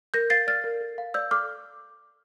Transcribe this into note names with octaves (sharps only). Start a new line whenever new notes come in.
A#4 G6 A#6
F5 A6 C7
D5 F6 A6
A#4
A4
F5
D5 E6 G6
A4 D6 F6